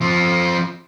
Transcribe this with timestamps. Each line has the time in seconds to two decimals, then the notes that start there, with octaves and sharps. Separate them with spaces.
0.01 F3 C4